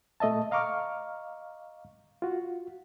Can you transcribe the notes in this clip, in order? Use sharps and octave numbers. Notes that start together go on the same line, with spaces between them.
A#2 A3 D#5 E5 A5
D#5 F5 A#5 C#6 D6 F6
F4 F#4